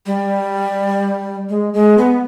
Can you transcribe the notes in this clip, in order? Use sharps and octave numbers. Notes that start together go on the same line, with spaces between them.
G3
G#3
G#3
B3